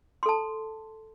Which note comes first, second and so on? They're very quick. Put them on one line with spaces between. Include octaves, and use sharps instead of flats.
C6 A4 A5